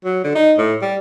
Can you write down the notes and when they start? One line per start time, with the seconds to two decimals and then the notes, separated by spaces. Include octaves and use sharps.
0.05 F#3
0.24 D3
0.35 D#4
0.58 A2
0.82 G3